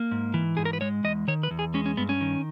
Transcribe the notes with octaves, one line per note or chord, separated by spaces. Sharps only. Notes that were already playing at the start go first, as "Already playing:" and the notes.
Already playing: A#3
G#2
E3
G#2 G#4
A#4
B4
G#3 C#5
E2 D#5
D#3 C#5
B4
E2
G#4
G#3 C#4
C#4
G2 B3
C#4
D#3